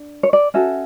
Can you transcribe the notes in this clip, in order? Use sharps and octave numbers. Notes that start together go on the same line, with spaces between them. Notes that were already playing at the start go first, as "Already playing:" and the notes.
Already playing: D4
C#5
D5
C#4 F#4 A4 E5